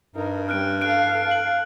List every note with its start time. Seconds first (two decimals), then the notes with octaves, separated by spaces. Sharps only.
0.15 G2 D#4 A#4
0.49 G3 C#4 F6 F#6 D7
0.81 A4 F5 F#6 D7
1.31 F#7